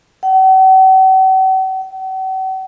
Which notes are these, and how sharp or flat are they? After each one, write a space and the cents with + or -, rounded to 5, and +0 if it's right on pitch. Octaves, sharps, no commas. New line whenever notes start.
F#5 +45
F#5 +45